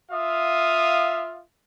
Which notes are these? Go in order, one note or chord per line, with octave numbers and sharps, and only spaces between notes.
F4 E5 F5 D#6